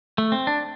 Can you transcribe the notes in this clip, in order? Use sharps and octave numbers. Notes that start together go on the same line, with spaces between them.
A3
C4
D4